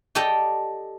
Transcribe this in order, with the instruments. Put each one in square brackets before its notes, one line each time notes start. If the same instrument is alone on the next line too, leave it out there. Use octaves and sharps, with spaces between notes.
[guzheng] G4 A4 D5 D#5 G5